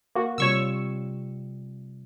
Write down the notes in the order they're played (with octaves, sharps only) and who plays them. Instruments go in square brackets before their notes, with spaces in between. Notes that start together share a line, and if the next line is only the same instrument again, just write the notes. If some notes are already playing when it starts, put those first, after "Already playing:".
[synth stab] A#3 F#4
[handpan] C3 G3 F4 [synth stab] C#5 C#6 E6